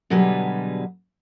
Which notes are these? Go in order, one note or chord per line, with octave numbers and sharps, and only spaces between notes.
B2 D3 F#3 G3 G#4 B4